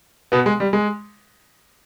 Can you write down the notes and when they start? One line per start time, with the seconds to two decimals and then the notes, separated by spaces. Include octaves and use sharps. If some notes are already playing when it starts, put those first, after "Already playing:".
0.32 B2 B3
0.46 G#3
0.60 G3
0.73 G#3